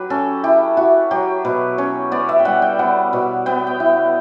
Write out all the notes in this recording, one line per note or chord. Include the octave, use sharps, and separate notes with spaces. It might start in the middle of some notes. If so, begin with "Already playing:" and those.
Already playing: F#3 G4 B4
C#4 A4
E4 G4
E4 F#4
F#3 G4
B2 B4
C#4 C#5
B3 D5
E5
G5
G3 F#5
G5
B3 F#5
B2
B3 G5
G5
E4